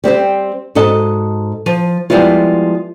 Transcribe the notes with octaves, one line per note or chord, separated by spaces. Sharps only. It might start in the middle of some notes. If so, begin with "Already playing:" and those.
G3 C4 G4 C5
G#2 F#4 A4 D#5 A5
F3
F3 G3 G#3 B3 E4 F4